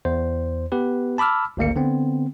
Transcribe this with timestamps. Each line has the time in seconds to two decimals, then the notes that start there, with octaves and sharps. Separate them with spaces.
0.05 E2 C5
0.72 B3 G4 B4
1.18 A5 B5 D6 E6 F6
1.57 G#1 D2 A#3 C#7
1.76 D3 B3 C4